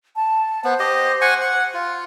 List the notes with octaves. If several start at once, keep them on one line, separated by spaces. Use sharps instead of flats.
A5
B3 C5
G4 D#5
F#5 G#5 C#6
F#5
F4